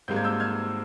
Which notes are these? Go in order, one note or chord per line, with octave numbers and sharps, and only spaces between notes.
G#1 G#2 G3 A#3 G6
G#6
E6 G6
F6 G#6